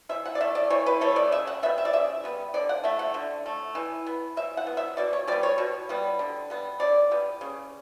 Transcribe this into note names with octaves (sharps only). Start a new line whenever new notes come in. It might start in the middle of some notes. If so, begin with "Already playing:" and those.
E3 E5
F#5
D5
A3 E5
D5
E3 C#5
B4
A3 C#5
D5
C#3 E5
F#5
G3 B3 E5
E5
D5
C#3 E5
G3 B3
D3 D5
F#5
A3 E5
F#5
D3
A3
E3
B3
E3 E5
F#5
B3
E5
B2 D5
C#5
G3 B3 D5
C#5
B2
G3 B3
D3
G3 B3
D3 D5
G3 B3
C#3